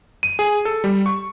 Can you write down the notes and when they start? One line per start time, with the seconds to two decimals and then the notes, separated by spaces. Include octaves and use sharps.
0.23 D#7
0.39 G#4
0.65 A4
0.84 G3
1.06 C#6